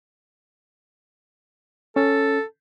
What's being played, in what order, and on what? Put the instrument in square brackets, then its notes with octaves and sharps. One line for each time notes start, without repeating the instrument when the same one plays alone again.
[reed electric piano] C#4 [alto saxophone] A4